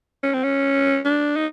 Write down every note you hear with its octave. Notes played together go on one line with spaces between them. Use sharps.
C#4
C4
C#4
D4
D#4